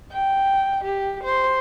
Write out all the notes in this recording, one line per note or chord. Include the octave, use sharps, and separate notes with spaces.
G5
G4
C5